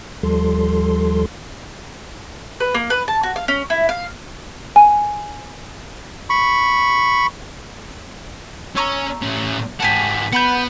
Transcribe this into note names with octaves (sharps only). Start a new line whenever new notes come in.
D#2 F3 G3 A4 C6
B4
A#3
B4
A5
F#4
F5
C#4
E4
F5
G#5
B5 C#6
C#4 A#5 C#6 E6
A2 C#4
G#2 F#4 G4 G#5 A5
B3 F#5 B5 G6